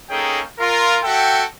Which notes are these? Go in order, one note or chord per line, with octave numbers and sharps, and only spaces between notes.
A#3 C#4 D#4 G#4 A4 G5
F4 A#4
F#4 A4 E5 G5